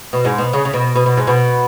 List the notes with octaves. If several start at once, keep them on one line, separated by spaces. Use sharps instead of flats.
B2
G#2
B2
C#3
C#3
B2
B2
B2
G#2
B2